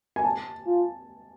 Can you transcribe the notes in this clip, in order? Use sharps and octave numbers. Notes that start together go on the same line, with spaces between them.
G#5
A5
F4